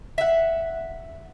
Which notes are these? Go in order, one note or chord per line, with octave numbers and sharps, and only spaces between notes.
E5 F#5